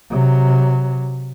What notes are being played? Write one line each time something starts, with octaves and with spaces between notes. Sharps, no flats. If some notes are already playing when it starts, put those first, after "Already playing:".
C3 F#3